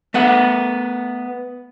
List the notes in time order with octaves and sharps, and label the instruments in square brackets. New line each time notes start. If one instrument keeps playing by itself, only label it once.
[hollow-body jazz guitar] A3 B3 F#5